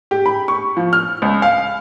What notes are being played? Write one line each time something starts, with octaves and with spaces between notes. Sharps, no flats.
G4
B5
C#6
F3
F6
C#2
F5